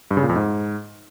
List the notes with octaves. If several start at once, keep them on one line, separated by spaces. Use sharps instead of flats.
G2
C#3
A#2
F2
G#2